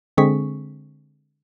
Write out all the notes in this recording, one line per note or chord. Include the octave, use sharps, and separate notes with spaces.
D3 G#3 C4 G#4 C#6 B6